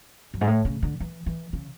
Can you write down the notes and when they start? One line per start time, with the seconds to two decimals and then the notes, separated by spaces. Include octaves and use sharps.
0.34 F#2
0.41 G#2
0.47 A2
0.65 C#3
0.83 D3
1.00 E3
1.26 E3
1.53 C#3